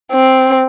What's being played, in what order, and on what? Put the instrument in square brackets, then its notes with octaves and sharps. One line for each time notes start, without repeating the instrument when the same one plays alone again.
[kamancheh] C4